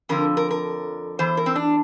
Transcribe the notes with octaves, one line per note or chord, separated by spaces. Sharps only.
F2 D3 F3 A#4
A#4
A#4
E2 E3 C5
A#4
C4
D4